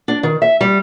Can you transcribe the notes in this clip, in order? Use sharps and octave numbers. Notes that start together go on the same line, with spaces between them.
D4
D#3
E5
G3